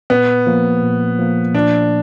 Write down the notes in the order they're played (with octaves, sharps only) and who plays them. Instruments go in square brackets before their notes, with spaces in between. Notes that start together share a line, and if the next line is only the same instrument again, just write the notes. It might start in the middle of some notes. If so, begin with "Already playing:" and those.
[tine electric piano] A#2 [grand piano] B3
[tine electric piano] F3 A#3
A#2
F3 A#3
[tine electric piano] A#2 [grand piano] D4